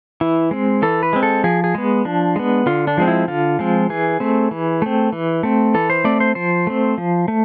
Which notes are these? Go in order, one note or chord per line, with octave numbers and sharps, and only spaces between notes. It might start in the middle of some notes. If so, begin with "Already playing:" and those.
E3 E4
G#3 C4
E3 A4
B4
G#3 C4
A4
F3 G#4
G#4
G#3 B3
F3 D4
G#3 B3
D3 F4
D4
F3 G#3 C4
E4
D3 F4
F3 G#3 C4
E3 G#4
A3 C4
E3
A3 C4
E3
A3 C4
E3 A4
C5
A3 C4 D5
C5
F3 C5
A3 C4
F3
A3